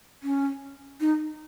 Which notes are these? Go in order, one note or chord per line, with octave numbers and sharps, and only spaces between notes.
C#4
D#4